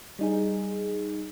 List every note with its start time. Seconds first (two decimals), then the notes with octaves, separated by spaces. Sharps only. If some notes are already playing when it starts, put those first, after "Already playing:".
0.19 G3 D#4 G#4